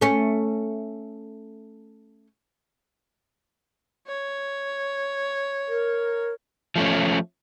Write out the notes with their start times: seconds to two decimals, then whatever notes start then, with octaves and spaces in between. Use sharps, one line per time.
0.01 A3 C#4
4.07 C#5
5.68 A#4
6.76 F3 A3 C#4